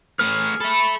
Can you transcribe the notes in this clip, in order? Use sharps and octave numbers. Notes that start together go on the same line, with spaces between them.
A3 G#4 B4 F6
A4 E5 B5